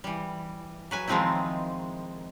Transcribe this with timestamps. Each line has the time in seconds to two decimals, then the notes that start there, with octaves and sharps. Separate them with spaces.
0.04 E3 G3
0.91 F#3 B4 G#5
1.08 D#3 F3 G#3 C4 D#4 E4